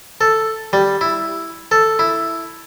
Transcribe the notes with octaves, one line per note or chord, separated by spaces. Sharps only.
A4
G3
E4
A4
E4